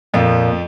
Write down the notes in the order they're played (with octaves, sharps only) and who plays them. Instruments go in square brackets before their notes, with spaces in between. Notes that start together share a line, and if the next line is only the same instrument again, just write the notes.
[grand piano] F2 F3 [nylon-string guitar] A#2